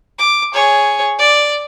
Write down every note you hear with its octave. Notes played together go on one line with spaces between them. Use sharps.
D6
G#4 C#5
D5